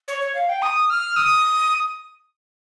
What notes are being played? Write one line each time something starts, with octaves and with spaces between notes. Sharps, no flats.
C#5
C#5
F5
G5
D#6
F6
D#6